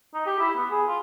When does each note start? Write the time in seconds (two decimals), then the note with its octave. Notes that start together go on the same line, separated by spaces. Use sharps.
0.14 D#4
0.26 G4
0.39 E4
0.57 B3
0.71 G#4
0.88 F4